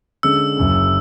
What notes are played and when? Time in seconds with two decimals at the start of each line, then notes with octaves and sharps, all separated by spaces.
0.23 D3 G#3 C#4 E6
0.57 F#1 F#2 C#3